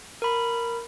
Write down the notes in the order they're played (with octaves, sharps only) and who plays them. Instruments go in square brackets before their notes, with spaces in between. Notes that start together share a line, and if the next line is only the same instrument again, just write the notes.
[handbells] A#4 B5